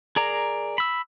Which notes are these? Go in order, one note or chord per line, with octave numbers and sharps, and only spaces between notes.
G#4 A#4 D5 A#5
B5 E6